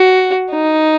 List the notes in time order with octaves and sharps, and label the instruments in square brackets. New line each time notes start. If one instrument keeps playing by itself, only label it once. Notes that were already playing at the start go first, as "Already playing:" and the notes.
Already playing: [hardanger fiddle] F#4
D#4